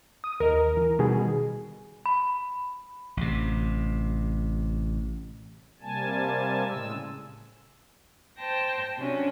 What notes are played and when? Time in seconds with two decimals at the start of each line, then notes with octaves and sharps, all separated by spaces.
0.24 D#6
0.40 D#2 A#4 D#5
0.77 E3
0.99 B2 D#3 G3 G#4
2.06 B5
3.17 A1 C3
5.82 C3 G3 A#3 G#5 A5
6.68 A2 C#3 G#3 E6
8.38 C5 G5 A5 A#6
8.97 C3 F#3 C#4 D4